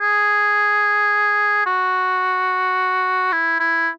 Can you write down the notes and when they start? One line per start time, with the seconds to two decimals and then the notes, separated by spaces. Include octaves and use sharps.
0.01 G#4
1.66 F#4
3.33 E4
3.60 E4